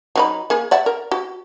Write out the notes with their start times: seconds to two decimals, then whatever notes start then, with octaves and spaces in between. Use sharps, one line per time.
0.16 F#3 D#4 B5
0.50 A#3 G#4
0.71 D5 E5 F#5
0.86 A#4
1.11 F#4